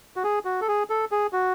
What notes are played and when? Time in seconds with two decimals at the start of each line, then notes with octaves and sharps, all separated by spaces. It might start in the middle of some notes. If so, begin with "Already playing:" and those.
0.16 F#4
0.24 G#4
0.45 F#4
0.61 A4
0.68 G#4
0.90 A4
1.11 G#4
1.33 F#4